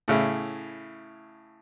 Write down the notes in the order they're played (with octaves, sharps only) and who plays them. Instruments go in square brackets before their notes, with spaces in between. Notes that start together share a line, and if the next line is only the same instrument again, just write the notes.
[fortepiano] A2 C#3 E4